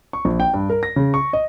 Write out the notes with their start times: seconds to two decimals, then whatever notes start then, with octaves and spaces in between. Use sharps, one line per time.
0.13 C#6
0.25 A#1
0.40 G5
0.54 G2
0.70 A#4
0.83 A#6
0.96 C#3
1.14 C#6
1.33 D#5